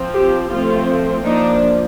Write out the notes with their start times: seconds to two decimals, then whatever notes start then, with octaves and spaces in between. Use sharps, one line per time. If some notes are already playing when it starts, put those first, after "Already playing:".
Already playing: F3 C4
0.14 G4
0.50 F3 A3 C4 F4
1.24 F3 A#3 D4 D#4